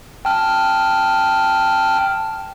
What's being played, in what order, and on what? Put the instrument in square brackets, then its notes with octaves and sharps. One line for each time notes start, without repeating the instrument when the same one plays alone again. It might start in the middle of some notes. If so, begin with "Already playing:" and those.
[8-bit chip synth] G5 A5 F6